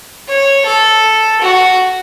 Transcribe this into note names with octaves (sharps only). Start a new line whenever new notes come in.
C#5
A4
F#4